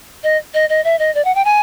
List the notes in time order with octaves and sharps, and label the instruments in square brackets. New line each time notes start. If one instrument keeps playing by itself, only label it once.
[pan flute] D#5
D#5
D#5
E5
D#5
D5
F#5
G5
G#5